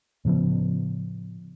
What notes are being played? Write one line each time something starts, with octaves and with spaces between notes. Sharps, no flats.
A2 C#3 F3 B3